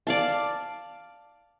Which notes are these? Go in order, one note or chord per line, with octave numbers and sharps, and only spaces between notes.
D5 F5 A5